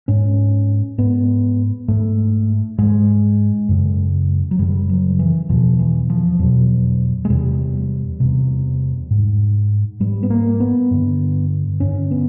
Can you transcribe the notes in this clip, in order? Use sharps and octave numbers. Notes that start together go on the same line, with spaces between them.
G#2 C#4
G#2 B3
G#2 A3
G#2 G#3
F#2 C#3
F#3
F#2 C#3 G3
F#3
E3
E2 B2 F3
E3
F3
E2 B2 F#3
G#3
E2 C3 G3
E2 C3
G#2
G#2 G3
B3
A#3
B3
G2 D3
G2 D3 C#4
B3